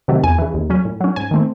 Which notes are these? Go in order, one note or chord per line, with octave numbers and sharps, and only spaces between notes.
C3 D#3 F#3 A3
E2 G#5
C#3 E3
D#2
C#3 F#3 C#4
A2
F#3 C#4
G#2 G#5
D#3 A3 C4